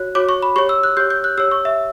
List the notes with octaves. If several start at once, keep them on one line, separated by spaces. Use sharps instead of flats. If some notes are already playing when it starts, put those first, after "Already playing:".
Already playing: F#4 C#5 F#6
F#4 C#5 D6
C#6
B5
G4 C#5 C#6
E6
F#6
G4 C#5 G6
G6
F#6
G4 C#5 E6
C#6
E5